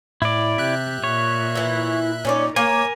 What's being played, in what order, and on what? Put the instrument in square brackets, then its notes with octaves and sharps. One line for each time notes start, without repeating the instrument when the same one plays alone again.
[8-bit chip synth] A2 [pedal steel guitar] E4 D5
[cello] C3 G4 [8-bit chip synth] E5 F#6
[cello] A#2 [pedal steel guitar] C#5
[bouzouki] E3 E4
[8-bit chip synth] A#2 [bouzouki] C#4 C#5 D5 [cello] D#4
[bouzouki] A#3 [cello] A#4 [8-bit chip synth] C#5 [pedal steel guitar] G#5